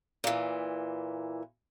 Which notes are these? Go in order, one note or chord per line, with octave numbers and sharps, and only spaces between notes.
A#2 E3